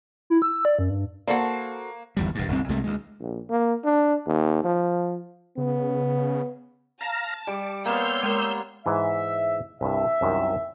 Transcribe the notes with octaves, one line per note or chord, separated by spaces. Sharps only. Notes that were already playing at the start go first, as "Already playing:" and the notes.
E4
E6
D5
F#2
G2
A#3 F#4 A4 C5 D5 F#5
G1 E2 G3
E1 G2
D1 C2 G#2 C4
C2 C3 G#3 A3
D2 G#3
A#1
A#3
D4
D#2
F3
C#3 B3
F5 A5 A#5
G3 D6
A#3 B3 C#5 C6 E6 F6 G6
G#3 A#4
G#2 E3 E5
C2 G2 E5
C2 F#2 D#3